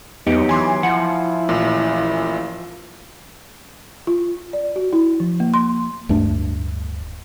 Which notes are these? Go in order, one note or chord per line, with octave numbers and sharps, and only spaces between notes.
E2 F#3 B3 D#4 G4 D#5
E3 G#5 C6 D6
F3 E4 F#5
A1 A#2
F4
D5
F#4
E4
F3
A#3
C6
D1 G2 A3 D4